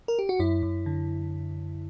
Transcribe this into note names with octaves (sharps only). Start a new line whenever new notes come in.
A#4
G4
F#4
F#2 E4
F#2
D3